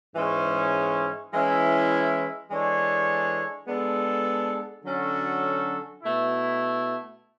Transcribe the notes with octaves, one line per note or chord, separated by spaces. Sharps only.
G#2 E3 G#3 C#4
E3 G#3 C#4 E4
E3 G#3 D4 A4 C#5
G#3 B3 D4 A4
D3 F#3 C#4 F#4 A4
B2 A3 E4